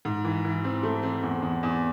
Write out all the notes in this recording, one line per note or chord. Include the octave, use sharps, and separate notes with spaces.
G#2
E3
E3
C4
A3
C4
E2
E2
E2